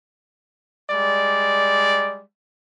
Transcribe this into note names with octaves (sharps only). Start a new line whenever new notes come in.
G3 G#3 D5